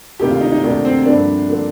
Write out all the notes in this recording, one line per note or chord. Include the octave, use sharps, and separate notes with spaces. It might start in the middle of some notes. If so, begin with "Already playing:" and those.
D2 C3 D#3 A#3 G4
F4
D#4
D#4
D2 C3 D#3 A#3 D4
C4
G2 D3 F3 A#3 D4
D3 F3 A#3